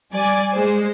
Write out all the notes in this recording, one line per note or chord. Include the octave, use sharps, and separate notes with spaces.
G3 D5 G#5
G#3 C5